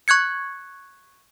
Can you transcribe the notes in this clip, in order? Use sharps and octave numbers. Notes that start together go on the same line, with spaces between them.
C#6 F#6 G#6 C#7